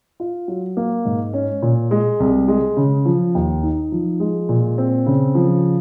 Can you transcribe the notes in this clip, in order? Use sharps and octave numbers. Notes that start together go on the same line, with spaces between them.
F4
F#3
A#3
G#2
C#4
A#2
G#3
C2
G#3
C#3
F3
D#2
D#4
F3
G#3
A#2
C4
C#3
F3